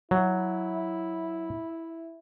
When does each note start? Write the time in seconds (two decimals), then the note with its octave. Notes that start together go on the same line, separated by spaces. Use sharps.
0.11 F#3 E4